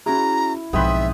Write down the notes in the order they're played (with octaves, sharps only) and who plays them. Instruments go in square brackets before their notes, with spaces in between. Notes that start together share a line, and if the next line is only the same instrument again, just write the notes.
[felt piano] C#4 F#4 G#4 [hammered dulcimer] E4 [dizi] A#5
[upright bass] B1 F3 [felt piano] G#2 [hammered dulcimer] B3 C4 B4 [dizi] E5